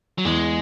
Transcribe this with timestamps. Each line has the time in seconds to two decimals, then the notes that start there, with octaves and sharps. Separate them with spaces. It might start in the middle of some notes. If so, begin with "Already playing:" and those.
0.18 F#3
0.25 E2 G#3